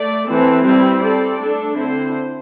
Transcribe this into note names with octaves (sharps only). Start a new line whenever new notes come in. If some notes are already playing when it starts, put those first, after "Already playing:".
Already playing: A3 D5
E3 C4 A4
G3 C4 E4 G4
C4 A4 D5
A3 D4 A4
D3 C4 E4 C5